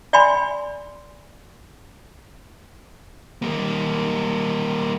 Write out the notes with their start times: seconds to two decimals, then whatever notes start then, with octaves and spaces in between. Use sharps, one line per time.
0.13 D5 G5 G#5 B5 C6
3.42 G3 A#3